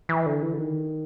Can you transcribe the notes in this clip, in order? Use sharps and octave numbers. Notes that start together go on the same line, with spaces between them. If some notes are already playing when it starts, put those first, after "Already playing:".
E3
D3
E3
D3
D#3